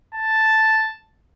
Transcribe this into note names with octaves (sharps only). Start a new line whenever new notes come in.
A5